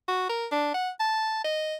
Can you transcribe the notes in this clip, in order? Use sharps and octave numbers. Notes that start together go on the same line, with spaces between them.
F#4
A#4
D4
F#5
A5
D#5